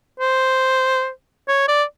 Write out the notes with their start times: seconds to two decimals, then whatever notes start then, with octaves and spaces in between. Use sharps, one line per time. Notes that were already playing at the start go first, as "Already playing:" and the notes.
0.20 C5
1.48 C#5
1.68 D5